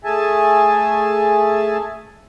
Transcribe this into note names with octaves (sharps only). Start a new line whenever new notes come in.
A3 G#4 E5 G#5 A5